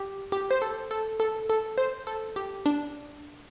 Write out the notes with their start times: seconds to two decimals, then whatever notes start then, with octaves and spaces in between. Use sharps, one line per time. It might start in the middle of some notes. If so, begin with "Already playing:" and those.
Already playing: G4
0.32 G4
0.51 C5
0.62 A4
0.91 A4
1.20 A4
1.50 A4
1.78 C5
2.07 A4
2.36 G4
2.66 D4